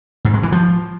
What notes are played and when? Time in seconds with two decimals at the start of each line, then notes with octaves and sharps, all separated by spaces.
0.25 G#2
0.34 G#3
0.43 E3
0.52 F3